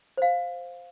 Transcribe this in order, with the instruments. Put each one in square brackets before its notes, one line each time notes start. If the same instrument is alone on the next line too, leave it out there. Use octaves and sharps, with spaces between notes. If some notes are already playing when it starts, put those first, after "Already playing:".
[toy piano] C5 F5